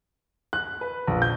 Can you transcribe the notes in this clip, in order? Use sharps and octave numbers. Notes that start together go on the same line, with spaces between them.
F#6
B4
A#1
G6